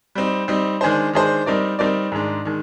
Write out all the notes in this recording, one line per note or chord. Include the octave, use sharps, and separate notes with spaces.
G3 C4 D#4
G3 C4 D#4
D#3 G#3 D4 G#4 C5
D#3 G#3 D4 G#4 C5
G3 C4 D#4 A#4 D5
G3 C4 D#4 A#4 D5
G#2 D#3 G#3 D4
D#3 G#3